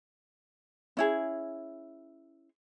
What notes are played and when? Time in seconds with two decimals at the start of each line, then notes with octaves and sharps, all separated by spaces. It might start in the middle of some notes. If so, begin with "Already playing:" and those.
0.97 C#4 E4 G#4